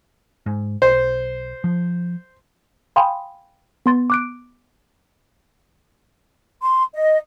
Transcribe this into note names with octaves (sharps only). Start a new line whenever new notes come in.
G#2
B1 C5
F3
F5 G5 G#5 B5 C6 D#6
B3 C6 A6
D6 F#6 D7
C6
D#5